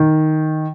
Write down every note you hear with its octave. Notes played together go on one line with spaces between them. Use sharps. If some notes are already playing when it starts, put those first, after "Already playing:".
Already playing: D#3